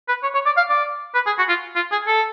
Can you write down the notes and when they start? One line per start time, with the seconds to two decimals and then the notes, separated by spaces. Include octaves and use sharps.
0.08 B4
0.23 C#5
0.34 C#5
0.46 D5
0.57 F5
0.69 D5
1.14 B4
1.26 G#4
1.38 F#4
1.49 F4
1.76 F4
1.92 G#4
2.07 A4